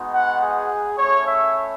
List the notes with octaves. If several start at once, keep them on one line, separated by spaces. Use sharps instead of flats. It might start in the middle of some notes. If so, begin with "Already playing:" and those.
Already playing: G#3 B3 D#4 F#4
F#5
G#4
A3 C#4 E4 C#5
E5